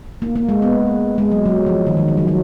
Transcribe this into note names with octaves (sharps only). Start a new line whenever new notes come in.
A#3
A#3
G#3
B3
G#3
F#3
F#3
F3
D#3
D#3
D#3
F#3
F#3